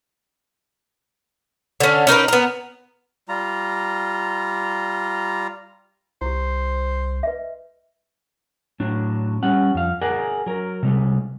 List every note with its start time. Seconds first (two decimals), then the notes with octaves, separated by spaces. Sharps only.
1.80 D3 C#4
2.07 C#4 D#4 A#4 B4
2.28 B3 A#4
3.28 G3 F4 A#5
6.21 C2 E4 G4 C5
7.23 B4 D#5 E5
8.80 A2 F#3 D4
9.43 G3 C#4 F#5
9.74 F2 F5
10.01 G#4 A#4 D5 F#5
10.46 F#3 A#4
10.83 C3 G3 G#3